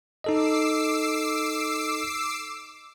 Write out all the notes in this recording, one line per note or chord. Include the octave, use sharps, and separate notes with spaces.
D#4 A4 D#5 D6 E6 C7